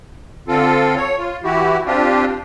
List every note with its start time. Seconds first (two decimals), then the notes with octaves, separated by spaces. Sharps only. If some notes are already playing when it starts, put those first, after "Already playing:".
0.48 D3 C4 F4 A4
0.96 C#5
1.18 F4
1.43 E3 E4 F#4 G4
1.86 C4 D4 F4 G4